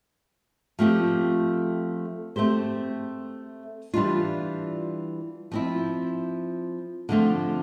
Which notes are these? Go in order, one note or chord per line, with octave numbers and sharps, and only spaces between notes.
F3 A3 C4 G4
A3 C4 G4 C5
E3 G3 D4 F4
F3 C4 E4
D3 F3 A3 C4